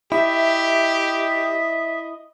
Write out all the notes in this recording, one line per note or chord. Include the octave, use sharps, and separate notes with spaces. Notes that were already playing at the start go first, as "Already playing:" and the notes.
E4 G4 D#5 E5